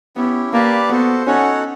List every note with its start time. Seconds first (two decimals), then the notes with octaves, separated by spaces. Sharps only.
0.16 B3 C#4 E4 G4
0.53 A#3 G4 B4 D5 F5 A5
0.89 B3 F#4 A4 C5
1.26 C#4 D#4 F#4 A4 C#5 F#5